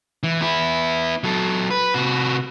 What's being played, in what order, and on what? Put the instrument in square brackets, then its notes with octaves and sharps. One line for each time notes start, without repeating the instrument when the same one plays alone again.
[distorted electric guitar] E3
B3 E4
F#3 A4
B4
C3 F#4